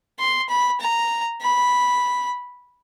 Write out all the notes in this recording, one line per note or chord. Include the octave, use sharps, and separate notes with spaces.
C6
B5
A#5
B5